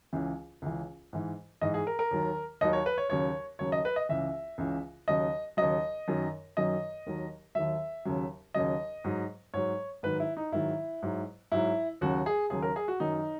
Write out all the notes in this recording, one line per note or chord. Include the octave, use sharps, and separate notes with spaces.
C#2 C#3 E3
C#2 C#3 E3
G#2 E3
G#2 E3 D#5
G#4
A#4
A#4
D#2 D#3 F#3
D#2 D#3 F#3 D#5
C#5
B4
C#5
D#2 C#3 F#3 C#5
D#2 C#3 F#3 C#5
D#5
B4
D#5
C#2 C#3 E3 E5
C#2 C#3 E3
D#2 C#3 F#3 D#5
D#2 C#3 F#3 D#5
F#2 D#3 F#3
F#2 D#3 F#3 D#5
D#2 D#3 F#3
D#2 D#3 F#3 E5
D#2 C#3 F#3
D#2 C#3 F#3 D#5
G#2 F#3
G#2 F#3 C#5
G#2 D#3 F#3 B4
E4
D#4
G#2 D#3 F#3 E4
G#2 F#3
G#2 F#3 E4
D#2 C#3 F#3 F#4
G#4
D#2 C#3 F#3 G#4
A#4
G#4
F#4
F#2 D#3 F#3 D#4